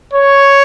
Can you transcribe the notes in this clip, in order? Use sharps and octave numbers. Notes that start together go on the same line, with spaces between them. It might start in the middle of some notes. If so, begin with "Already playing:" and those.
C#5